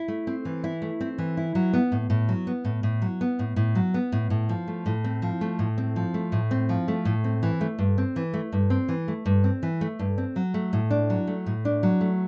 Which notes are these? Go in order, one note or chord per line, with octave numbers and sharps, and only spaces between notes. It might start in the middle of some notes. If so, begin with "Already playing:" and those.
Already playing: E4
A3
C4
E3
E4
A3
C4
E3
E4
F#3
B3
A2
A2
F#3
B3
A2
A2
F#3
B3
A2
A2
F#3
B3
A2
A2
F3
A3
A2
C4
F3
A3
A2
C4
F3
A3
A2
C4
F3
A3
A2
C4
E3
A3
G2
C4
E3
A3
G2
C4
E3
A3
G2
C4
E3
A3
G2
C4
F#3
A3
A2
D4
F#3
A3
A2
D4
F#3
A3